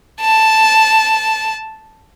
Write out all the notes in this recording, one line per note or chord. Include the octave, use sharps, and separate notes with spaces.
A5